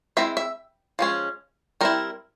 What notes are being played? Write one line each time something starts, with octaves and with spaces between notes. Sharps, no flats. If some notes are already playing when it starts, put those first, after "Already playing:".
G#3 C4 E4 E5
E5
F3 G#3 C#4
G3 C4 E4 A#4